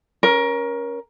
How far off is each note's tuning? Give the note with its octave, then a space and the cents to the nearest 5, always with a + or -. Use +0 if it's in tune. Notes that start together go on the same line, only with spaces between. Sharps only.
C#4 +0 A#4 +25